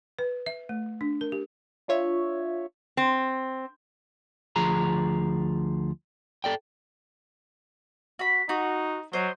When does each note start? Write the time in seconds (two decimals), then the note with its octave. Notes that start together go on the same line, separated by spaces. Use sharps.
0.19 B4
0.46 E5
0.69 A3
1.01 D4
1.21 A#4
1.32 G4
1.88 D4 F4 C#5 E5
2.97 C4
4.56 D2 F3 G#4 A#5
6.44 A4 D5 G5
8.19 F#4 B5
8.49 D#4 F#4
9.13 F#3 C5 D#5